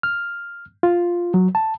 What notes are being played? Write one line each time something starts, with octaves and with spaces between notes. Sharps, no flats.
F6
F4
F#3
A5